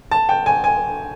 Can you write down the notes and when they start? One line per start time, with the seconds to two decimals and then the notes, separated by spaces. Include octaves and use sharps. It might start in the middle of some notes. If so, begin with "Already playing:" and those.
0.11 A5
0.29 G5
0.46 G#5
0.64 G#5